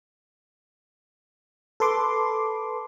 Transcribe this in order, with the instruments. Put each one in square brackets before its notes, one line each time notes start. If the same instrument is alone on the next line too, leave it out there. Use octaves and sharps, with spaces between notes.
[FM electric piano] A4 B4 C6 D6